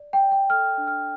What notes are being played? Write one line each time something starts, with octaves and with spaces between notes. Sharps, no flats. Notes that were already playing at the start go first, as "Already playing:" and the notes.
Already playing: D5
G5
D5
G5
A4 F6
D4
F6